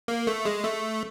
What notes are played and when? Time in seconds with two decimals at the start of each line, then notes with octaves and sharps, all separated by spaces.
0.08 A#3
0.27 A3
0.45 G#3
0.64 A3